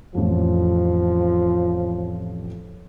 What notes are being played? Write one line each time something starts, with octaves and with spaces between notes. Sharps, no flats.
A1 F2 F3